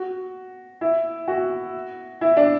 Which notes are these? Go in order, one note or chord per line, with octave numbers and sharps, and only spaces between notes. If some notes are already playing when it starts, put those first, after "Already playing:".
Already playing: F#4
E4
F#4
E4
D4